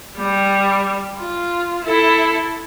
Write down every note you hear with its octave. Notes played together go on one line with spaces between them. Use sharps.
G3
F4
E4 A4